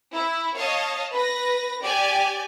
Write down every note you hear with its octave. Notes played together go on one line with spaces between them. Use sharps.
E4
C#5 D#5 F5 A5
B4 A#6
G4 D5 G#5